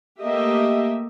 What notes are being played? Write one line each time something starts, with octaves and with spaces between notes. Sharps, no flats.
A3 A#3 G4 D#5 E5